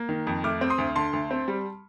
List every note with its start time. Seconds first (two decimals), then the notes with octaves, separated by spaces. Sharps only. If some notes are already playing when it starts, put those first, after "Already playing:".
Already playing: A#3
0.09 D#3
0.27 F2
0.44 A3 D6 F6
0.61 C4
0.70 C6 D#6
0.78 D2
0.96 D3 A5 C6
1.13 D2
1.31 C4
1.48 G3